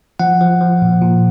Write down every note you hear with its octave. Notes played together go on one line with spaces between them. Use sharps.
F3 F#5
F3
F3
A#2
A#2